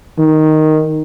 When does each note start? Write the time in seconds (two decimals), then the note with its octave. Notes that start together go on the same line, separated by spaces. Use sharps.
0.19 D#3